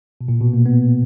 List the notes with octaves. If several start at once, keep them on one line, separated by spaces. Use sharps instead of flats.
B2
A#2
B2
A#3
B3